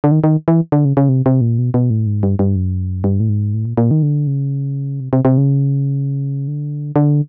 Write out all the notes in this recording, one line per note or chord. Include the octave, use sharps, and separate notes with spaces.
D3
D#3
D#3
E3
D3
C#3
C#3
C3
C3
A#2
B2
B2
A2
G#2
G2
G2
F#2
G2
A2
G#2
A2
A#2
A#2
D#3
D3
C#3
C3
C3
C3
C#3
D3
D3